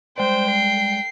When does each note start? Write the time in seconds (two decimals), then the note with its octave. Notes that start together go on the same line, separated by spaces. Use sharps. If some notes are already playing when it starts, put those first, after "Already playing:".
0.18 G3 G#3 C5 D5 G5
0.51 C7